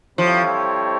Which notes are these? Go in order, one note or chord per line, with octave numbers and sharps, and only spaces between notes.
F3 G3 C4 E4 A4 C#5